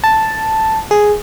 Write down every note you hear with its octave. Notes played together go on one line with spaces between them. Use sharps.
A5
G#4